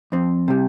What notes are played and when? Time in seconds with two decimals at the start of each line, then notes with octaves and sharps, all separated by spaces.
0.12 F2 C4
0.48 C3 G3